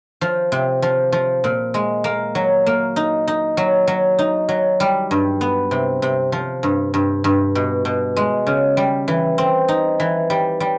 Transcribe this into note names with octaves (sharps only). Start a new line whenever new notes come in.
F3
C3
F3
F3
A#2
G#3
A#3
F#3
A#3
D#4
D#4
F#3
F#3
D#4
F#3
G3
G2
B3
C3
C3
F3
G2
G2
G2
B2
B2
G#3
C#3
G3
E3
C4
D#4
E3
G3
G3